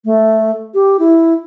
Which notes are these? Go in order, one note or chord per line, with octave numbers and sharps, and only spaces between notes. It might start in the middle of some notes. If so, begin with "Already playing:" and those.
A3
G4
E4